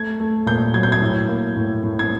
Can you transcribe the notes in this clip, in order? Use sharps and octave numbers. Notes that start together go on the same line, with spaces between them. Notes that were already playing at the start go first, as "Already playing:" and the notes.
Already playing: A3 G#6
A3
A#2 G6
F#3 G#6
G6
G#6
A2
A#3
A2
A2
G#6